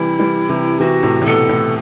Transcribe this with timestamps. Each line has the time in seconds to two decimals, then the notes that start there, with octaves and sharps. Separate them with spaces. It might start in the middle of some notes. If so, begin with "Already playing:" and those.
Already playing: C3 E3 G3 E4
0.19 E3 G3
0.49 C3 E3
0.80 C3 E3 F#4
1.03 A2 C3
1.22 A2
1.25 B2 A4
1.49 A2